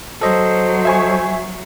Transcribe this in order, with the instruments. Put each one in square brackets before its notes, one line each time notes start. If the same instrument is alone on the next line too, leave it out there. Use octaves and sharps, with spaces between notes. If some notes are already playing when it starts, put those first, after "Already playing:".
[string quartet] F#3 [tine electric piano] A4 D#5 [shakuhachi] C5
[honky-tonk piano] E5 G#5 C#6